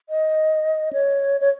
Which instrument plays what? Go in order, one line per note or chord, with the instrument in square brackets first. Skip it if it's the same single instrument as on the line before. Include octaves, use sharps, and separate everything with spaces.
[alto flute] D#5
C#5
C#5